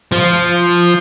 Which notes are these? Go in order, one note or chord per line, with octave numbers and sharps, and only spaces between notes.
F3